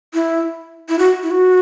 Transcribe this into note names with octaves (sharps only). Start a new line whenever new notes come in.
E4
E4
F#4
E4
F#4